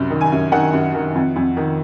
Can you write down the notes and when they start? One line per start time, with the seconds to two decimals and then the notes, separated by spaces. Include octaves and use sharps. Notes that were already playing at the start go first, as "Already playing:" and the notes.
Already playing: C2 F#2
0.10 D#3
0.21 G#5
0.32 F#2
0.52 D#3 F#5
0.73 F#2
0.94 D#3
1.15 F2
1.36 F2
1.57 D#3